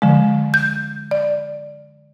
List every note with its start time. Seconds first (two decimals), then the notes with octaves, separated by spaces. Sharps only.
0.02 D3 F3 G#3
0.54 G6
1.11 D5